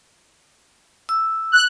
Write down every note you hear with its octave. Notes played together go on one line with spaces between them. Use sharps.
E6
F#6